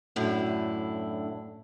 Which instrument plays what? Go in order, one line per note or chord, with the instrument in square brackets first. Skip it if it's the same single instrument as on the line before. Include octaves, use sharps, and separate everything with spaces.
[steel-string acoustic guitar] F#2 A2 D3 D4 E4